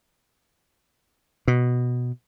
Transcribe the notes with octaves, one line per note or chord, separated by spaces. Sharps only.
B2